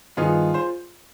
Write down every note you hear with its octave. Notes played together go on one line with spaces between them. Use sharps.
G2 D#3 B3 D#4 F4 G#4
C5